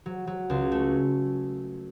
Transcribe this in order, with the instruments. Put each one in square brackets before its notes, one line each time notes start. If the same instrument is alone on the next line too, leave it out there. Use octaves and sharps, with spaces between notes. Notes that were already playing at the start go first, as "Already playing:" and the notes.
[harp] F#3
F#3
C#2
A3